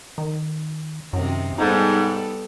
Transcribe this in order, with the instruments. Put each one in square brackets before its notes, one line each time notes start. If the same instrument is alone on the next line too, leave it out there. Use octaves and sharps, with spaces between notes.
[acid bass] D#3
[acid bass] F#2 [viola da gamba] C3 D#3
[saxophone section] G#2 [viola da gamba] G3 B3 A4 [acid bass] D#4